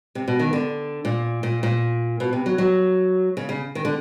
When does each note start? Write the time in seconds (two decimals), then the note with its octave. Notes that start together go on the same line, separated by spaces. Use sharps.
0.15 C3
0.28 B2
0.40 D#3
0.53 D3
1.05 A#2
1.43 A#2
1.63 A#2
2.20 B2
2.33 C3
2.46 F#3
2.58 F#3
3.37 C#3
3.49 C#3
3.75 D#3
3.85 D3